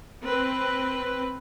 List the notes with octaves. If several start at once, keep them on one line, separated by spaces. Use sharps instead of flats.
C4 B4